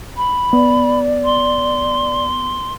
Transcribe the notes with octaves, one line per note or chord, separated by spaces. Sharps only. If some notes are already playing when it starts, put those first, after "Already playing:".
B5
B3 D5
C6